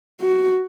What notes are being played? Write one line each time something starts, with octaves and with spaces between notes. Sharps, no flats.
F#4